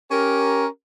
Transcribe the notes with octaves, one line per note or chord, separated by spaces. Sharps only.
C#4 G4 A#4